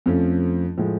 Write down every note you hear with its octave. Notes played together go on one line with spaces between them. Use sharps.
F2 F3 A3 C#4
A2 F3 G#3